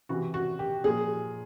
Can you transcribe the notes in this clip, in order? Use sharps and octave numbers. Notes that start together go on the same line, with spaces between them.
C3 E3 F#4
F#4
G4
A#2 F3 G#4